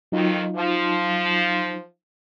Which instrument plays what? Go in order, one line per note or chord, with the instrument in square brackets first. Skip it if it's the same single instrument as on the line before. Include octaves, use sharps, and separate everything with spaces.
[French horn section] F2 D#3 [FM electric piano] F#3 D#4 F4
[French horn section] F3